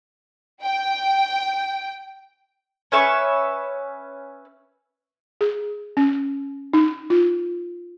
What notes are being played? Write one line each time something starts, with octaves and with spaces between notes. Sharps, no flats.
G5
C#4 B4 E5 C#6
G#4
C#4
D#4
F4